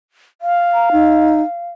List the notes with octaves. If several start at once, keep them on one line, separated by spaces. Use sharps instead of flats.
F5
A#5
D#4